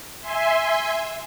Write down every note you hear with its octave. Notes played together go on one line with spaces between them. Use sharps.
E5 G#5 C6